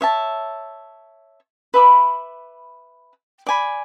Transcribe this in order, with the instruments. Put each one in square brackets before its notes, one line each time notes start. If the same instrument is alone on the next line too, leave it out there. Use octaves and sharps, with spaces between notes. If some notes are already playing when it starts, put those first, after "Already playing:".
[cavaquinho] C#5 E5 A5
B4 E5 B5 D6
D5 G#5 B5